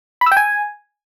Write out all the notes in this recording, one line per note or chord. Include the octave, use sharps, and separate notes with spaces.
B5
E6
G5
G#5